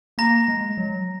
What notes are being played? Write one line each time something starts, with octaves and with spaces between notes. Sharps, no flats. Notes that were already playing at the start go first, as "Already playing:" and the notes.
A#3 A#5 A#6
G#3
F#3